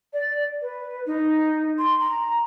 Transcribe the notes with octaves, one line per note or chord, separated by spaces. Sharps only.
D5
B4
D#4
C6
A#5